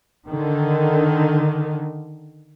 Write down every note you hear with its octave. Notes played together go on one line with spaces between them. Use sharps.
D3 D#3